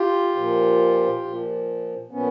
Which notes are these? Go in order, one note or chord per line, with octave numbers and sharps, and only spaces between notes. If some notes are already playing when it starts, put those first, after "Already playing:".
Already playing: F4 G4
A#2 F3
A#2 F3
A#2 F3 B3 C#4